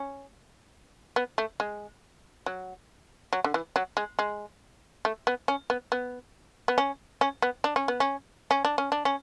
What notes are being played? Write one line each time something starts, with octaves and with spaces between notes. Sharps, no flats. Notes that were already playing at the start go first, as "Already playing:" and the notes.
Already playing: C#4
B3
A3
G#3
F#3
F#3
D3
E3
F#3
G#3
G#3
A3
B3
C#4
B3
B3
B3
C#4
C#4
B3
D4
C#4
B3
C#4
C#4
D4
C#4
D4
C#4